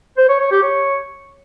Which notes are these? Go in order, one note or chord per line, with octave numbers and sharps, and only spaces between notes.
C5
C#5
C#5
G4
C#5